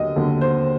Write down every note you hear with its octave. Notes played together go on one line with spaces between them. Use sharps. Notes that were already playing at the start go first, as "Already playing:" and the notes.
Already playing: D#2 D3 F#3 D#5
D#2 D3 F#3
C5